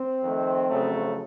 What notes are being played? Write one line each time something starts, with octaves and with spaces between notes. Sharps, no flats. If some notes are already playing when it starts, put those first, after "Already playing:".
Already playing: C4
F2 D#3 A3
F2 C#3 F#3 A3